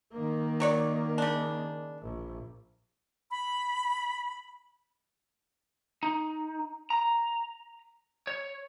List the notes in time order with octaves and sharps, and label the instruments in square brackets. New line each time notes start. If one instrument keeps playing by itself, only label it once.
[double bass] D#3 A#3
[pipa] F#3 C#5 D5
C#3 D4
[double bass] A#1
[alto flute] B5
[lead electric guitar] D#4
A#5
C#5